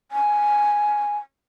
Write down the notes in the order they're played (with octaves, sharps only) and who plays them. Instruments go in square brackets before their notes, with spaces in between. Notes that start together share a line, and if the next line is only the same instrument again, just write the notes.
[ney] G#5